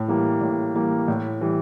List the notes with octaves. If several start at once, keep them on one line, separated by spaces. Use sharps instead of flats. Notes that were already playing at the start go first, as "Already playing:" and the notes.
Already playing: A2
E3 G3 A#3
A2
E3 G3 A#3
A2
E3 G3